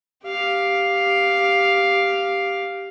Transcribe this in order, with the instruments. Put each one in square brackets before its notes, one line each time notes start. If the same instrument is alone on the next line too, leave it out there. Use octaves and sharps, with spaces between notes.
[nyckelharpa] G4 F5